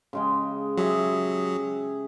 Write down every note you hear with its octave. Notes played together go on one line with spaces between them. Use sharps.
C#3 G#3 G5
F#3 G4 G#4 E5